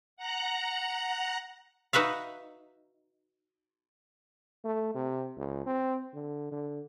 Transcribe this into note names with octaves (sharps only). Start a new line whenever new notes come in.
F#5 A#5 F#6
D#4 F#4 B4 E5 F5
A3
C3
C#2
C4
D3
D3